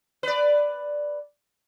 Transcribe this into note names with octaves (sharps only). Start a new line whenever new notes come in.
B4 D5